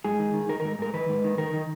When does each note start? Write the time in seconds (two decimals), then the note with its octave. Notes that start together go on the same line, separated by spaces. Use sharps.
0.04 G#2 G#4
0.19 D#3
0.34 D#3
0.49 D#3 A#4
0.60 G#2 A#4
0.79 G#2 A#4
0.94 D#3 B4
1.09 G#2
1.24 D#3
1.38 D#3 A#4
1.53 D#3